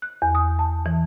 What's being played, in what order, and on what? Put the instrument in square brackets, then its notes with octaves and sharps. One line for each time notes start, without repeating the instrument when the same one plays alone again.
[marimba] F#6
E2
D#6
A5
E3